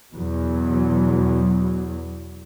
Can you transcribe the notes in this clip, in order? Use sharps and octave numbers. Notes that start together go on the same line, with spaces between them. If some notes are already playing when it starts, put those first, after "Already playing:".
E2 B2 F#3